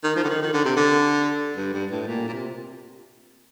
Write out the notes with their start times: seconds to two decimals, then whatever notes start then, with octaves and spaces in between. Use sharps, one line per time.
0.04 D#3
0.16 F3
0.24 D3
0.30 D#3
0.42 D#3
0.54 D3
0.65 C3
0.76 D3
1.57 G2
1.73 G2
1.91 A2
2.07 A#2
2.28 A#2
2.33 C3